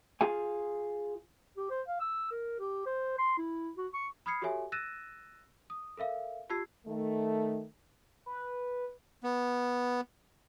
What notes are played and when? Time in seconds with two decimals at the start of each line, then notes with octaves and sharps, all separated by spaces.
0.21 F4 G#4 F5 G#5
1.57 G4
1.71 C5
1.88 F5
2.00 E6
2.31 A#4
2.59 G4
2.86 C5
3.18 C6
3.38 E4
3.77 F#4
3.94 C#6
4.26 B5 D#6 F6 G#6 C7 C#7
4.41 F#4 G4 A4 C#5 E5 G#5
4.72 E6 F#6 A6 A#6 D#7 E7
5.70 D#6
5.97 A4 A#4 E5 F5
6.50 F4 G4 A5 E6 G#6 C7
6.86 D#3 A3
8.26 B4
9.24 B3